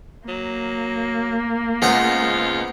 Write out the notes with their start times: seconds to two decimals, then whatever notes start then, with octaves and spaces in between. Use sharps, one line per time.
0.28 F#3 A#3
1.82 C#2 B3 F4 C5 A#5